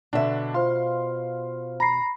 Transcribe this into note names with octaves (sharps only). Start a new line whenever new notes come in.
B2 D3 D4 E5
F4 C5 F5 C6
A#5 B5 A#6 C7